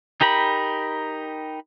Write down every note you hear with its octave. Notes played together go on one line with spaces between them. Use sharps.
D#4 G4 A#4 B5